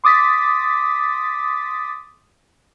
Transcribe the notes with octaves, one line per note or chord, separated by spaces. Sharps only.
C6 D6 D#6 A6 B6